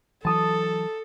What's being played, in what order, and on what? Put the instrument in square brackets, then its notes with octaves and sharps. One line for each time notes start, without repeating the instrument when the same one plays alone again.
[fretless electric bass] E3 F#3 [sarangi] A4 [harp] A5 D#6